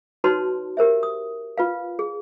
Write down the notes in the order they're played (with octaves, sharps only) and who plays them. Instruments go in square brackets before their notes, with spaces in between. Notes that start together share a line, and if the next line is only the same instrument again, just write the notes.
[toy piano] D#4 F#4 B4 C#5 A5 C6
G4 A#4 C5 E5
D#6
F4 B4 F5
G#4